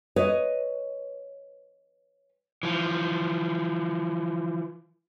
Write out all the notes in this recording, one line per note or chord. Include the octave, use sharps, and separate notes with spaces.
B4 C#5 D#5
E3 F3